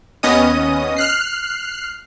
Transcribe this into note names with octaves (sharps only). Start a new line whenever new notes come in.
D#2 B3 C#4 D#5 D#6
F6 F#6 C7